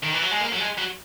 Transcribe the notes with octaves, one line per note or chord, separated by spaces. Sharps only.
D#3
E3
F#3
G#3
A#3
F#3
G#3
F#3